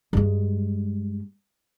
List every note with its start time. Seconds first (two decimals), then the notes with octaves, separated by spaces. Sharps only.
0.13 G2 G#3